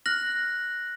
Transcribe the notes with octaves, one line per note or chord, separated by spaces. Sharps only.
F6 F#6 A#6 F#7